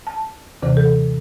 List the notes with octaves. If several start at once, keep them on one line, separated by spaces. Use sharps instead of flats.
A5
D#2 C3 E3 C5
A4